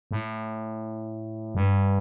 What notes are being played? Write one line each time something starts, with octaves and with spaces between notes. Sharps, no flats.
A2
G2